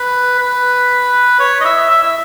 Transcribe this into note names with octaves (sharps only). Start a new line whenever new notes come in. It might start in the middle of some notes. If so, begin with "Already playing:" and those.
Already playing: B4
B4
C#5
D#5
E5
E5
E5